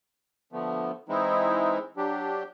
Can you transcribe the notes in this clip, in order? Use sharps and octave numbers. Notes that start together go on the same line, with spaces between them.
D3 F3 A3 B3
E3 G#3 C4 D#4 E4
F#3 D4 G4